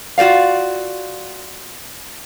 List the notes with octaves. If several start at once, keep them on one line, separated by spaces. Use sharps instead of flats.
F4 F#4 B4 D5 F5